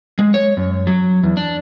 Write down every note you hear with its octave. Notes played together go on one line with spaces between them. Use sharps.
G#3
C#5
F#2
F#3
E2
D4